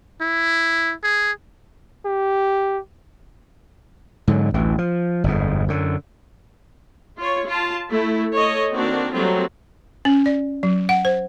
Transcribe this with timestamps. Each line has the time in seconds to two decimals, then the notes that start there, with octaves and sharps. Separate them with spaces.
0.21 E4
1.03 G#4
2.06 G4
4.28 G#2 D3 F#3
4.54 A1 D2 E3
4.78 F3
5.24 G1 F2 G#2
5.68 F#2 D3
7.18 F4 C#5
7.47 F4 A5
7.90 A3 E4
8.33 A4 C#5 D#5
8.72 D#3 A#3 C4 D4 F#4
9.13 F#3 G3 A3 A#3 C4 F4
10.05 C#4
10.26 D5
10.63 F#3
10.89 F#5
11.05 C5